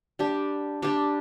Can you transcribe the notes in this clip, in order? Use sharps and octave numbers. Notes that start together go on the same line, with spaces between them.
G3 D4 G4
G3 D4 G4